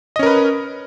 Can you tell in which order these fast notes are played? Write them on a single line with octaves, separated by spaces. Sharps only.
D#5 C#4 A#4 B4